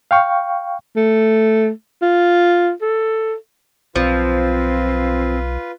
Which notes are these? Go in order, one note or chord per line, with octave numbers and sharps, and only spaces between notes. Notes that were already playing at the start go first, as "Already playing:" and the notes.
F5 G5 C#6
A3
F4
A4
B1 F3 C4 F4 B4